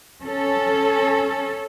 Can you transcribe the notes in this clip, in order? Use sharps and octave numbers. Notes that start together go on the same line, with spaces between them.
C#4 A4